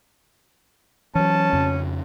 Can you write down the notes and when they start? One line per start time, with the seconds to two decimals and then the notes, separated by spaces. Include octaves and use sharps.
1.15 E3 F#3 C#4 A5
1.53 F2 C#3